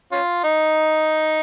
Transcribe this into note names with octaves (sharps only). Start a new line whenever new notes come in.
C#4 F4
D#4